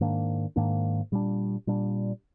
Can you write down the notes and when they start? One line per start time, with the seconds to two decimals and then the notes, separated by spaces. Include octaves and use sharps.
0.01 G#2 D#3 A#3 D4
0.56 G#2 D#3 A#3 D4
1.12 A#2 G3 D4
1.67 A#2 G3 D4